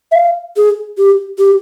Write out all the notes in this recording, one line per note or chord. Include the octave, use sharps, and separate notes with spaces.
E5
F5
G#4
G4
G4